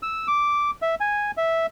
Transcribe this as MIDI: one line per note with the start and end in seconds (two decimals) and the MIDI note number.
0.03 0.27 88
0.28 0.71 86
0.82 0.95 76
1.00 1.31 80
1.37 1.66 76